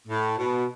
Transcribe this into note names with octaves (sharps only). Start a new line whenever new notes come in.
A2
B2